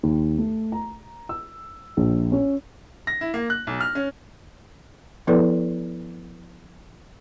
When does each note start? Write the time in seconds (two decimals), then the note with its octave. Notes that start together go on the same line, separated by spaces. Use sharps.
0.03 D#2
0.38 A3
0.72 A#5
1.29 E6
1.97 A#1
2.32 C#4
3.07 A#6
3.21 E4
3.34 A#3
3.50 F#6
3.67 B1
3.81 F6
3.95 C#4
5.27 F3 B3 E4 A4 B4 D5